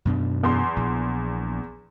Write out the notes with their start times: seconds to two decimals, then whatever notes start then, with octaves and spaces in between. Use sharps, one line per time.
0.05 F#2 B2 D4
0.43 E2 C6
0.76 A#1